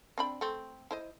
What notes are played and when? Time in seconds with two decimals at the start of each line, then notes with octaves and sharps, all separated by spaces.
0.18 C4 D4 B5
0.41 A3 C4
0.91 E4 C5 D#5